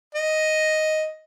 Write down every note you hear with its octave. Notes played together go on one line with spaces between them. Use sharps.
D#5